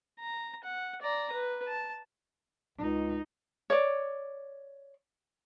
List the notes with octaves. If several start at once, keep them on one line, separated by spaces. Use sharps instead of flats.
A#5
F#5
D5 A#5
B4
A5
C#2 D#4
C#5 D5